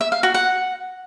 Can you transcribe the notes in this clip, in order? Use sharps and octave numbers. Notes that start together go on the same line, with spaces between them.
E5
F5
F#4
F#5